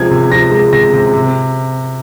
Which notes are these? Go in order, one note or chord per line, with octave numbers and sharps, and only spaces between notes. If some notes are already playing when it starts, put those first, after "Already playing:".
Already playing: C3 F3 G#3 G#6
C3
F3 A#6
G#3
C3 A#6
C3
C3